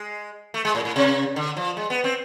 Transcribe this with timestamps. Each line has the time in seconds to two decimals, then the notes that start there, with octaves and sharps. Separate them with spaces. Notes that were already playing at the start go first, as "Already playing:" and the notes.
Already playing: G#3
0.54 A3
0.65 G#3
0.75 A2
0.85 A2
0.96 C3
1.36 D3
1.57 F3
1.77 G#3
1.90 B3
2.04 C4